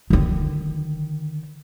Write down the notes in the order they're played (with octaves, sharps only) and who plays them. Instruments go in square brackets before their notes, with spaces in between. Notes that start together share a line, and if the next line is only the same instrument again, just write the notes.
[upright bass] D3 D#3